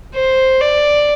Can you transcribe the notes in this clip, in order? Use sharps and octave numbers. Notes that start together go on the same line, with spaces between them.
C5
D5